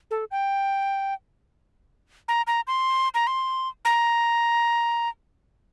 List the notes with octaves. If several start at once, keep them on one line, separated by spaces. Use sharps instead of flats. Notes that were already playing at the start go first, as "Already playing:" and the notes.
A4
G5
A#5
A#5
C6
A#5
C6
A#5